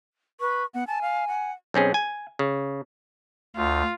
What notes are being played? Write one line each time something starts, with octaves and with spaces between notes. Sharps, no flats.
B4 C#6
B3 F#5
G#5 A5
F5
F#5
B1 C4 C#4 G#4
G#5
C#3
D2 F4